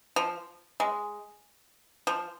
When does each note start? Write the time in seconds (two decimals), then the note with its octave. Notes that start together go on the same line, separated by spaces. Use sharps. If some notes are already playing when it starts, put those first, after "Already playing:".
0.16 F3
0.80 G#3
2.07 F3